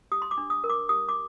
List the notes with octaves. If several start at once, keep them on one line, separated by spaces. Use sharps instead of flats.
G4 D#6
C6
D6
D4
D#6
A#4
D6
G4 D#6
D6